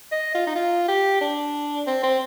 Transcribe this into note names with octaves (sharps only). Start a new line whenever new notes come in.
D#5
F4
D#4
F4
G4
D4
C4
C4